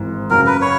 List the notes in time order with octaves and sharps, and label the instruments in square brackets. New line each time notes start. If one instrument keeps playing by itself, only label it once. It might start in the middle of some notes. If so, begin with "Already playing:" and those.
Already playing: [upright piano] G#1 G#2 E3
[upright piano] F#2 C#3 F#3 [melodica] A#4
[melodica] B4
C#5